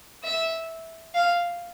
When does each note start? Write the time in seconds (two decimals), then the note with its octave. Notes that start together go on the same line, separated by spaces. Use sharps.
0.24 E5
1.15 F5